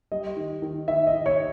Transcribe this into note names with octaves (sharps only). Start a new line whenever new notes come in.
G3 D#5
D#3
D#3
D#3 E5
D#5
D#3
C#5